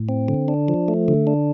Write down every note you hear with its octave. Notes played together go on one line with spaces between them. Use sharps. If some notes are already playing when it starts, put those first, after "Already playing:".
Already playing: A2
C4
D3
D4
F3
A3
D3
D4